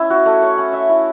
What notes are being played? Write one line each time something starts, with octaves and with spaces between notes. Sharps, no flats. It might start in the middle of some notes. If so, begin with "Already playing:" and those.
Already playing: C#4 E4 E5
F#4
A3
C#5
C#4
E5
E4